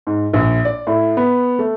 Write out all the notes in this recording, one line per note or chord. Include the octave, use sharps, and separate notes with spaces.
G#2
A#1
D5
A2
B3
A3